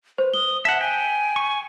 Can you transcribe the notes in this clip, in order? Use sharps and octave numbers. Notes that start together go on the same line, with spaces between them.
B4 C5
D#6 G7
E5 F#5 A5
G5 G#5
C#6